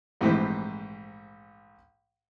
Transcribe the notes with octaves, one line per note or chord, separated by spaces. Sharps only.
A#1 G#2 E3 A3 C4 G4